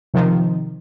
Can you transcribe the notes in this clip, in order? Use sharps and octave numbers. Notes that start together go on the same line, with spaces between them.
C3 D#3 F3